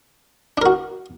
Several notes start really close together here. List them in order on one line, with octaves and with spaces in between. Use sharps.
D4 A#4 F#4